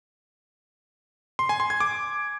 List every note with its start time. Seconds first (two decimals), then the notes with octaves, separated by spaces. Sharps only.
1.39 C6
1.49 G#5
1.60 C6
1.70 G#6
1.80 D6